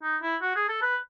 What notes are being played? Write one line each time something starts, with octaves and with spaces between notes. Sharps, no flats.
D#4
E4
F#4
G#4
A4
B4